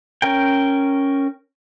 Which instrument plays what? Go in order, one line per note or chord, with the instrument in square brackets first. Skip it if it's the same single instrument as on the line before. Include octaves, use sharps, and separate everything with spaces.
[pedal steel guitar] C#4 A#4 G5